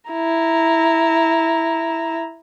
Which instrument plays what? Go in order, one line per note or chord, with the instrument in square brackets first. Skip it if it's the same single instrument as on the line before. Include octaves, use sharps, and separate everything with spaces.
[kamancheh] E4 A#5